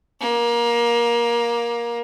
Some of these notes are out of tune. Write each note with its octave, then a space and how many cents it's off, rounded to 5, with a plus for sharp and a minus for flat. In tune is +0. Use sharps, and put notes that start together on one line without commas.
A#3 +20